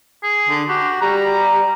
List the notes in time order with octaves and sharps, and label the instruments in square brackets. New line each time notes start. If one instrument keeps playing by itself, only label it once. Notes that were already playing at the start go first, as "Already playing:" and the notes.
[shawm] G#4
[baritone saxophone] D3
[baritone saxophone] F#4 [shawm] G4
[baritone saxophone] G3 [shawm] A#5